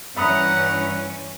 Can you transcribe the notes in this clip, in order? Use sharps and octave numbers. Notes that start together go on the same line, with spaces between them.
G2 E3 C#4 E5 F#5 A#5 B5 D#6